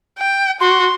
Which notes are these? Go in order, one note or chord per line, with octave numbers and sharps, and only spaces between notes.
G5
F#4 C6